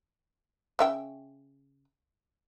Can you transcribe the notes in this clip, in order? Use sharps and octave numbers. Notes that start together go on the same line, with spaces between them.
C#3 E5 G5